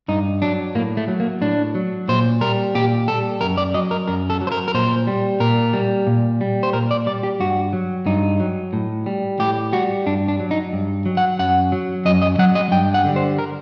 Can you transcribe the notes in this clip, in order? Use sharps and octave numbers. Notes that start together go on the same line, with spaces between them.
G2 D#4
F#3 D4
A2 A#3
A3
F#3
A#3
A2 D4
F#3
A#2 C5
G3 A#4
A#2 G4
G3 A4
F#2 A#4
D5
F#3 D#5
A#4
F#2 A#4
A4
F#3
C5
A#4
A#4
A#2 C5
G3
A#2 A#4
G3
A#2
G3
C5
A#2 A#4
D5
G3 D5
G4
G2 F#4
F#3
G2 D#4
F#3
A2
G3
A2 G4
G3 F#4
G2 D4
D4
F#3
D#4
G2
F#3
F#5
F#2 F#5
F#3
F#2 D#5
D#5
F#3 F#5
D#5
G2 G5
F#5
D3 G3
C5
A#4